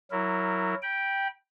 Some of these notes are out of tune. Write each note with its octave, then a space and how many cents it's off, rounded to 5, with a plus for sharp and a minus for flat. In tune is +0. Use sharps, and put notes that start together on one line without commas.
F#3 +5 E4 +0 A#4 -20
G5 +0 B5 -30